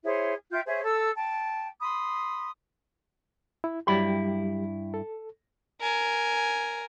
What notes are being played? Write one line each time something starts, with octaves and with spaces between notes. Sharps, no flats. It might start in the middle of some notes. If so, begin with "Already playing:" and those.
E4 G#4 C5 C#5
F4 E5 G5 G6
G#4 C5 C#5 E5
A4 E6
G5 A5
B5 C6 D#6
E4
G2 F#3 G3 E4 G4 B5
A4
A#4 G#5